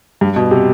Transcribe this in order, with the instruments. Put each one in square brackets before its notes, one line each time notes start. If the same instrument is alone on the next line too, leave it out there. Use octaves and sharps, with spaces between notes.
[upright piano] G2
B2
C3